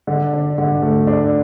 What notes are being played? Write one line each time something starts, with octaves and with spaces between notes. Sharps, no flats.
D3
D4
D3
A3
D4